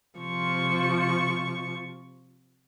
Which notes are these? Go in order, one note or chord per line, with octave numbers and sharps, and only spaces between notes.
C3 F3 C#6